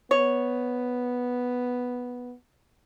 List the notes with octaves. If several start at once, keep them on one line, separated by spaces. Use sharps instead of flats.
B3 C#5